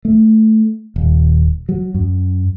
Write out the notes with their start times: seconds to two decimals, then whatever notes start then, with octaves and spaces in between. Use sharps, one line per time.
0.05 A3
0.96 D#1
1.69 F#3
1.94 F#2